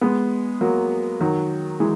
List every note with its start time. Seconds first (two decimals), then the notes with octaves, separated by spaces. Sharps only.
0.01 G#3 B3
0.61 F#3 A#3
1.20 D#3 F#3
1.80 E3 G#3